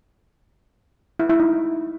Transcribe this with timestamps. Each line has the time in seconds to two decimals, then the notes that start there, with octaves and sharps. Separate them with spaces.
1.19 E4
1.30 E4
1.40 D#4